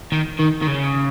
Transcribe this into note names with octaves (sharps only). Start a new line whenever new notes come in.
D#3
D#3
D#3
C#3